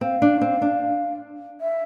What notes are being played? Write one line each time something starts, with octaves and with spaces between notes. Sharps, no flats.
C4 F5
D4
C4
D4
E5